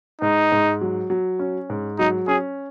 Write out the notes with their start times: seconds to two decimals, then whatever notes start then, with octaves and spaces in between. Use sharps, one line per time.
0.21 G#2 D#4
0.52 G#2
0.81 F#3
1.10 F#3
1.39 C#4
1.70 G#2
1.99 F#3 D#4
2.28 C#4 G#4